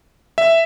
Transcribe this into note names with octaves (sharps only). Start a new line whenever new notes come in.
E5